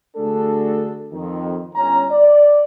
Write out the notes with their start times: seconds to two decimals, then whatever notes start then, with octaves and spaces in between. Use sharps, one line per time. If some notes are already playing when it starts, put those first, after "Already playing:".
0.17 D3 A3 D4 F#4 G#4 A4
1.13 F2 D#3
1.75 G1 C#4 A#5
2.11 D5